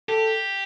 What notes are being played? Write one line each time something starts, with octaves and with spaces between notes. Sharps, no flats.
G4 A4